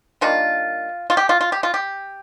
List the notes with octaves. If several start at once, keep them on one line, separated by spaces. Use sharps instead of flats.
D#3 G3 A#3 D4 F4
F4
G4
F4
F4
G4
F4
G4